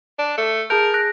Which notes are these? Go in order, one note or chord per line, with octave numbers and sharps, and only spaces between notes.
D4
A3
G#4 A#4 A5 G6
F#6 A#6 D7